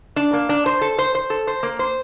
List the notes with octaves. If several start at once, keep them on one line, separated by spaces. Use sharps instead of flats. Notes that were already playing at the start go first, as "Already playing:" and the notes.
D4
A#3
D4
C5
A4
C5
C5
A4
C5
A#3
C5